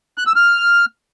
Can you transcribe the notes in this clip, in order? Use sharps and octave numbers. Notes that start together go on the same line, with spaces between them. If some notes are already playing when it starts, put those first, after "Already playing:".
F#6
E6
F6